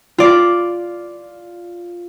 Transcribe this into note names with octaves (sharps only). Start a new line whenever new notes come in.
F4 D5